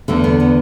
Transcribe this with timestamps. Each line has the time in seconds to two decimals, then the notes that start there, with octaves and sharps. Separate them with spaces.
0.08 E2 D3 A3
0.24 B3
0.40 B3